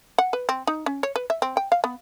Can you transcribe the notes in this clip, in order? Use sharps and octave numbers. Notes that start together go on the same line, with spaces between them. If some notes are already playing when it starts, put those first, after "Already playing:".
F#5
B4
C4
D#4
C#4
C#5
B4
E5
C4
G5
F5
B3